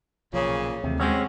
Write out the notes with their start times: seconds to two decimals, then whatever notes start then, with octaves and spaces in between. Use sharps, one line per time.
0.33 B1 A#2 C#3 F3
0.84 D#2 C3 E3 A3
1.00 G#3 C4 C#4 F#4 G4 C#5